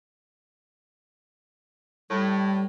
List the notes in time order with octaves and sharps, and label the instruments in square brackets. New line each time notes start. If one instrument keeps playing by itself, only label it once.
[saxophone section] A2 [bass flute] G3